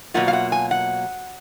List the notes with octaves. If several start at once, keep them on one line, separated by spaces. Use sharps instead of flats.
B2 F#3 A#3 F4 F#5
F5
F#5
G#5
F#5